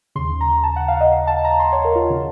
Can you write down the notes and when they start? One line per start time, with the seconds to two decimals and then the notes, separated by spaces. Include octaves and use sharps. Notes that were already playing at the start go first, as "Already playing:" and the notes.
0.15 C#3 C6
0.18 D#2
0.41 A#5
0.64 A5
0.76 F#5
0.88 F5
1.00 D#5
1.12 F5
1.27 A5
1.45 A#5
1.60 C6
1.72 C#5
1.85 A#4
1.96 F4
2.10 C#3